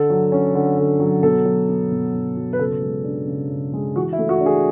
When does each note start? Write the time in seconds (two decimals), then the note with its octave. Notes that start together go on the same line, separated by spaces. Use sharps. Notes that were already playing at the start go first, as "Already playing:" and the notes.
Already playing: D3 A4
0.10 F#3
0.32 C#4
0.54 D3
0.78 D3
1.00 F#3
1.23 B2 A4
1.45 F#3
1.69 B3
1.92 B2
2.14 B2
2.37 F#3
2.53 B4
2.59 C#3 A4
2.82 G#3
3.04 D4
3.27 C#3
3.50 C#3
3.73 G#3
3.96 E3 F#4
4.13 E4
4.19 A3
4.29 F#4
4.40 D4
4.46 G#4